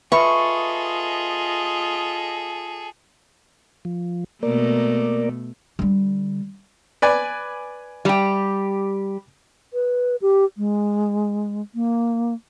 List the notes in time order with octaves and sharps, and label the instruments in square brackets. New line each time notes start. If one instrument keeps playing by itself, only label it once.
[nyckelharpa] F4 D#5 [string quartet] G#4 A4 [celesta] B4 E5 B5 [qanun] C#6
[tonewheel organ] F3
[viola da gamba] B2 A3 [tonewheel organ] A#3 A#4 D5
[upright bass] D3 G3
[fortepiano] B4 D5 G#5
[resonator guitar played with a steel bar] G3 G4
[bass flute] B4
G4
G#3
A#3